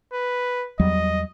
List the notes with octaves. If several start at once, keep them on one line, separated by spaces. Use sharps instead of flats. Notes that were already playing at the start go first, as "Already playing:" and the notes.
B4
E2 F#3 G3 D#5